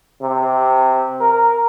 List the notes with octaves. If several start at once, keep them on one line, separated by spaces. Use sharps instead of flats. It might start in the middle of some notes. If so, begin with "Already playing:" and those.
C3
A#4